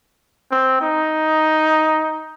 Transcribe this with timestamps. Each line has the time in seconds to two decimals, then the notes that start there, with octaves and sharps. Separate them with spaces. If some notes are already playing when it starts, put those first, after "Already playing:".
0.51 C4
0.81 D#4